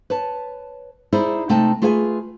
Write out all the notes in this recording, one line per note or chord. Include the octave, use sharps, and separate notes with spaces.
B4 C#5 A5
D#4 E4 G#4 C5 D5
C3 A3 D#4 G5 A5
A3 F4 G#4 B4 G5 G#5